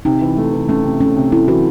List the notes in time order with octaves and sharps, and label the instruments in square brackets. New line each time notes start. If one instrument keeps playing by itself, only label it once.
[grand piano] C3 [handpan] D#4
[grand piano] E3
A3
E3
[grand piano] A3 [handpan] C#4
[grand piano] C3
[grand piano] A3 [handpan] C#4
[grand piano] C3
[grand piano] A3 [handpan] E4
[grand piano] E3 [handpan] F#4